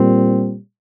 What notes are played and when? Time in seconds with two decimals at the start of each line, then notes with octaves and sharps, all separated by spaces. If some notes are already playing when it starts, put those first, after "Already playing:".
Already playing: A#2 G3 C4